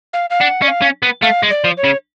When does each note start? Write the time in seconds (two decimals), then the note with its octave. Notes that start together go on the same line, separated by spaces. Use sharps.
0.13 F5
0.30 F5
0.40 D4 F#5
0.62 C#4 D5
0.68 F5
0.82 C#4
1.03 B3
1.23 A3 F5
1.43 G#3
1.50 D5
1.64 F3
1.77 C#5
1.84 C#3